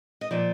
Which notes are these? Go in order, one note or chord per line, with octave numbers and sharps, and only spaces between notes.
D#5
A#2 F3 D5